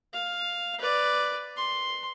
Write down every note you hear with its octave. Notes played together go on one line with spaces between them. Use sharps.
F5
B4 D5
C6